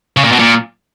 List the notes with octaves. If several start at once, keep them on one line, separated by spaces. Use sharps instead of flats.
C#3
A#2
B2
A#2